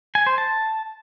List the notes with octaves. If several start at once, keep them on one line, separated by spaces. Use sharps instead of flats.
G#5
C5
A5